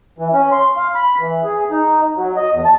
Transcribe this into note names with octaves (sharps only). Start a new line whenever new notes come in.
E3
C#4
C6
F5
B5
E3
G#4
D#4
F#3
D#5
E2
A5